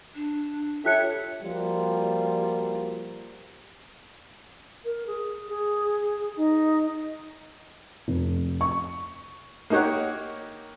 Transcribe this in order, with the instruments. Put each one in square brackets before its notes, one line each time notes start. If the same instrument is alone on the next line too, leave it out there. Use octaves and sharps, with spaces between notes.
[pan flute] D4
[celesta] F4 F#6 C#7 [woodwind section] G4 A4 E5 [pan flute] C#5
[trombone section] F3 G3 A#3 F4 F#4
[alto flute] A#4
G#4
G#4
D#4
[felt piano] F1
C#6
[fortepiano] A#3 D#4 G4 C#5 F#5